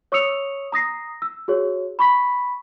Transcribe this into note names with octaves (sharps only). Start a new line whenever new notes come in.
C#5 C#6 D#6 E6 C#7 F7
A#5 D#6 A#6 C7
E6
F#4 G#4 C#5
B5 C#6 B6